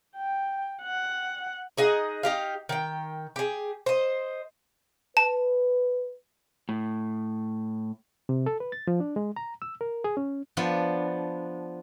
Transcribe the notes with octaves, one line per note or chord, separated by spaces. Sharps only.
G5
F#5
D#4 G#4 D#5 F#5
D#4 G4 F5
D#3 G5
G4 G#4
C5 D#5
B4 A5
A2
C3
A4
B4
A6
F3
D4
G#3
A#5
E6
A#4
G#4
C#4
F3 B3 D4